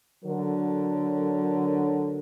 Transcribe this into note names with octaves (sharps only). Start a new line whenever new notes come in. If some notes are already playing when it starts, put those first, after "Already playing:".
D3 F#3 A4 A#4